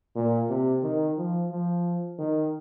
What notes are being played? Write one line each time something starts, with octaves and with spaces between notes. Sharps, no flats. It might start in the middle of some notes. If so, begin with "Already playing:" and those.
A#2
C3
D#3
F3
F3
D#3